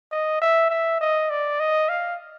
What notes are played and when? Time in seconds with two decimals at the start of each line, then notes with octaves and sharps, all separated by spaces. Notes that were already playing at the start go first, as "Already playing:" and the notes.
0.11 D#5
0.41 E5
0.70 E5
1.01 D#5
1.30 D5
1.60 D#5
1.89 F5